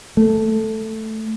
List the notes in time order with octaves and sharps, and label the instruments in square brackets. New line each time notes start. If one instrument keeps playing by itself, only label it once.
[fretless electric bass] A3